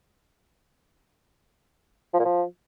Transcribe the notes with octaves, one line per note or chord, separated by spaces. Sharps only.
F3
A#2
F3